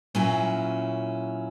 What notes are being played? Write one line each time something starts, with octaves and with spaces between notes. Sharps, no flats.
A#2 F#3 C#4 E4